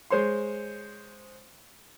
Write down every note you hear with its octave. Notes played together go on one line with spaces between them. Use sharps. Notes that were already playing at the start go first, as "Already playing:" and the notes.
G#3 C5 C#5 C6